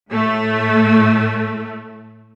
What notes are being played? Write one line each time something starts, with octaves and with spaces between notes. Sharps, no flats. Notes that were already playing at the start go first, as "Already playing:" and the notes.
A2 A3